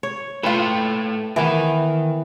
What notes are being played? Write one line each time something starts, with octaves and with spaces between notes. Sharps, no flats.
C#5
A3 E4 F4 B4 G5
D#3 E3 B3 A#4